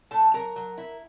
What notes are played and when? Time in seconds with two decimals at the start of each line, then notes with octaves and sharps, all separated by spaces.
0.11 A2 A4 A5
0.34 F#3 A#4 A#5
0.56 F#3
0.78 E4